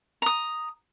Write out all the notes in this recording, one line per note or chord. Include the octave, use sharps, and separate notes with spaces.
A#5 D#6